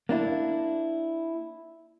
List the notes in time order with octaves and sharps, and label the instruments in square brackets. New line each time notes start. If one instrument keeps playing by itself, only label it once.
[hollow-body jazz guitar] A#3 D4 E4